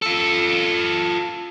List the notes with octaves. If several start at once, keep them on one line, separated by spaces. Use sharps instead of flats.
F4 A4